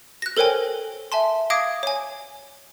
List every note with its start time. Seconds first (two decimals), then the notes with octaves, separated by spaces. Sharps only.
0.22 F#6 A#6
0.37 A4 A#4 C5 C#5 G5 G#5
1.12 E5 G#5 A5 C6
1.50 F5 D6 D#6 G#6 A#6 D7
1.83 C#5 G#5